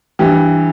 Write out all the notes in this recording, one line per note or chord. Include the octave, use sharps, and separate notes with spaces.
G2 E3 G4